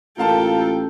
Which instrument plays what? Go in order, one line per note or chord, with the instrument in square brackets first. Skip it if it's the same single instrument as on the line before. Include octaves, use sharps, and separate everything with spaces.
[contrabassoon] A1 [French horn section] A#3 F4 [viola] A4 G5 [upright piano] A#4 F5 A5